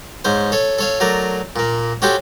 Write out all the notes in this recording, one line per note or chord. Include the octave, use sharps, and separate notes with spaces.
G#2 C#4 C5
A4 C#5
A4 C#5 F5
F#3 A3 A#4 D5
A#2 A#3
C#4 F#4 G4 A4 C5